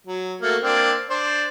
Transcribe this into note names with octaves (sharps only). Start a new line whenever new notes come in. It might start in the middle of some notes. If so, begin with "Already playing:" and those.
F#3
A3 A#3 F#4
A#3 C4 D4
D4 C5